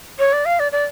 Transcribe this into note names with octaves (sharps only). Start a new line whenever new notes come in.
C#5
D5
F5
D5
D5